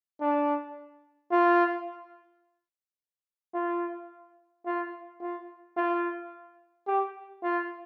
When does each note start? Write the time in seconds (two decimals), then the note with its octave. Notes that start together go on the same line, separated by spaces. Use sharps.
0.21 D4
1.32 F4
3.54 F4
4.66 F4
5.21 F4
5.77 F4
6.87 G4
7.43 F4